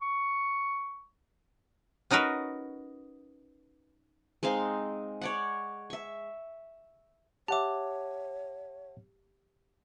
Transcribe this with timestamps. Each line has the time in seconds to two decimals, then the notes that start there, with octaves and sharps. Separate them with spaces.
0.02 C#6
2.11 C#4 D#4 F#4 A#4 B4
4.43 G#3 C4 D#4 F5
5.21 C#5 D5 F#5
5.90 E5 C#6
7.48 G4 C#5 E5 F#5 A5 D6